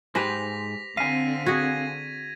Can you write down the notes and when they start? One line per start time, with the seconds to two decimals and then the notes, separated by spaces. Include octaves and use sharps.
0.15 G#2 G4 B4 C5 G#5 A#6 B6 F7
0.97 D3 C4 F5 G#5 A#6 B6 D#7
1.46 F#4 G#4 G#6 A#6